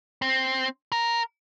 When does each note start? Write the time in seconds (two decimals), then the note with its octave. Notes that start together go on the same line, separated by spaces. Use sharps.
0.22 C4
0.92 A#4